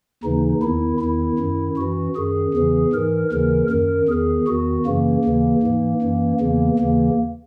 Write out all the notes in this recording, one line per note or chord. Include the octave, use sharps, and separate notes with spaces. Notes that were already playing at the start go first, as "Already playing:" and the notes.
D#2 C#3 E3 D#4
E2 D#3 E4
E2 D#3 E4
F#2 D#3
F#2 E3 F#4
F#2 D#3 G#4
E2 C#3 E3
G#2 E3 A#4
D#2 C#3 E3 A#4
F#2 D#3 A#4
E2 D#3 G#4
E2 D#3 F#4
F#2 C#3 E3 A#3
D#2 C#3 E3
G#2 E3
F#2 E3
E2 C#3 E3 A#3
D#2 C#3 E3 A#3